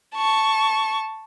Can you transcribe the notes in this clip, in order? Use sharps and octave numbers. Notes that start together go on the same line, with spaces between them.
A5 C#6